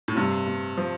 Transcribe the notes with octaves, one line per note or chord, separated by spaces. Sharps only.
A2
G2 C3
C3
F3